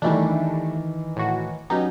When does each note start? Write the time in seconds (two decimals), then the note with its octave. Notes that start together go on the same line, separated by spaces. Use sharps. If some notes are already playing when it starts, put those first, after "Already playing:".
0.02 D#3 E3 G3 A3 D4
1.16 A2 F#4
1.70 F#3 B3 C#4 D#4 G4